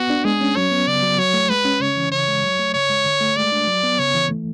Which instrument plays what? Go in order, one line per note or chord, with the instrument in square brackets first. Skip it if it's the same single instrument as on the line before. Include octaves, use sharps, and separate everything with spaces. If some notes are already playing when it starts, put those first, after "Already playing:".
Already playing: [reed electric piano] B3 [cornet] F#4
[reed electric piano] D4
[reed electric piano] G#3 [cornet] G#4
[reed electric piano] C#4
[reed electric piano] F#3 [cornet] C#5
[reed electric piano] B3
[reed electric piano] C#3 [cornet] D5
[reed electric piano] F#3
[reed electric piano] F#3 [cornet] C#5
[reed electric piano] A3
[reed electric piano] G#3 [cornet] B4
[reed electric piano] C#4
[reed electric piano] C#3 [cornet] C#5
[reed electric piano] E3
[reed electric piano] C#3 [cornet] C#5
[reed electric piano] G#3
F#3
A3
[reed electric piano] C#3 [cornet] C#5
[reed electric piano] G#3
D3
A3
[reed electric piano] G#3 [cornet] D5
[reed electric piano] D4
F#3
B3
[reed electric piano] C#3 [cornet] C#5
[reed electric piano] E3
A3